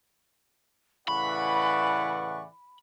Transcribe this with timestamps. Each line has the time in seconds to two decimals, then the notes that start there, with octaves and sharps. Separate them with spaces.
1.08 A2 C#3 E3 B4 D5 F#5 B5 C#6